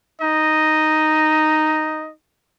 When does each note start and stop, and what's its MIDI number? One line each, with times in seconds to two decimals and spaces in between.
0.21 2.12 63
0.21 2.10 75